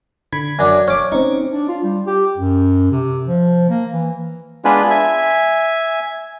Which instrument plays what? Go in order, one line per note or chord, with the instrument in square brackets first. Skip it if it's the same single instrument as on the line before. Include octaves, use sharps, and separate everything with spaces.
[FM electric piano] D3 B5 G#6
[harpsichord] F#2 D4 [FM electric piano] G#5
[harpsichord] C#4 D6 [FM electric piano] C#5
[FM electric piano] C4 C#4 D#4 [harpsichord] C#6
[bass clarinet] D4
F4
G3
G4
F#2
C3
F3
A#3
E3
[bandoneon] G#3 B3 D4 F4 G#4 B4
E5 G#5